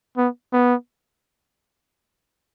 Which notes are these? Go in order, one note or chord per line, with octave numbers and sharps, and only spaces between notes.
B3
B3